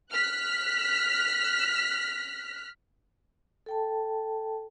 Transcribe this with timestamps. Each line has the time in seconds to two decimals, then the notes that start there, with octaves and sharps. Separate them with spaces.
0.12 F6 F#6 B6
3.66 A4 G5 A5